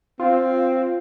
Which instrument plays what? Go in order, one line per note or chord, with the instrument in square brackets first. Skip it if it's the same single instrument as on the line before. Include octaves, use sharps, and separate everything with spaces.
[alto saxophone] C4 [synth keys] F4